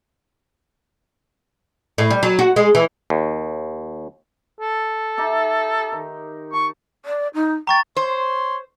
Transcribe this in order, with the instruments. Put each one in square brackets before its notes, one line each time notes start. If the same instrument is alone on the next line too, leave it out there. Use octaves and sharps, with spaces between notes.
[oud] A2
G3
F#3
F#4
G#3
E3
[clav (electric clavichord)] D#2
[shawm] A4
[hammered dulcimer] D#4 G4 E5
D#3
[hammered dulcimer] A5 [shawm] C#6
[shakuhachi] D5
D#4
[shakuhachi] G5 [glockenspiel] A#5 C#6 A6
[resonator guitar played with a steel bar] C5 [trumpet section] C#5 C6